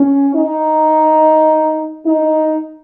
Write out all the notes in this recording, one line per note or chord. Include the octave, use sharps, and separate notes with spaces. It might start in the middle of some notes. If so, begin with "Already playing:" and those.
Already playing: C#4
D#4
D#4